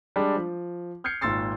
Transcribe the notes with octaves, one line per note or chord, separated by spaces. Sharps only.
G3 G#3 D4
F3
F6 G6 G#6 C7 C#7
G#1 A#2 C6 E6 A6 C7